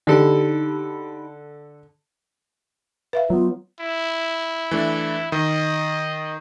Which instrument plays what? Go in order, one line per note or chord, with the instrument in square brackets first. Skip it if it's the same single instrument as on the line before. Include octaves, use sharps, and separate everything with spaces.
[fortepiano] D3 A4 [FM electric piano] D#4 G4 B5
[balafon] B4 E5 F5
[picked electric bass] F#3 B3 [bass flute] F4
[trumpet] E4
[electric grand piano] E3 A3 D4
[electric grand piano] D#3 [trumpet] D#5